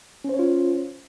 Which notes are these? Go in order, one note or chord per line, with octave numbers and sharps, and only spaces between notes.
C#4 F4 C5 C#5